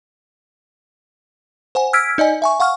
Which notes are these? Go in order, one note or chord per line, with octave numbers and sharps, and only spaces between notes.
C5 F#5 G#5
E6 F6 G#6 B6 D7
D#4 D5 D#5 G#5
E5 G#5 C#6
F5 F#5 C#6 F6